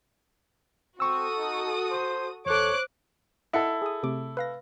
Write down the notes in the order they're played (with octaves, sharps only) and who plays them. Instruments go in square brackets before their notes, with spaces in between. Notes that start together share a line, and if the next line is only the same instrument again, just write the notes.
[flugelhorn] C4 [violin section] F#4 A4 D#6 [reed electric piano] C#6 E6
[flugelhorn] D#4
C5
[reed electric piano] E2 A4 [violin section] C5 D6 F#6 [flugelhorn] C#5
[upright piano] E4 A4 [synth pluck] D#5 F#5 C#7
[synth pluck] G#4 D#6
C3 A3 D6
B4 F5 A#6